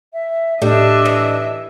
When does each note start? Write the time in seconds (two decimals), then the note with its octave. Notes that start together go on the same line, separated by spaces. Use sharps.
0.13 E5
0.62 A2 G3 D4 D#5 E5
1.05 E3